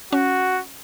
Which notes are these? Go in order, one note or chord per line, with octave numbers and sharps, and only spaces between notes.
C#4 F#4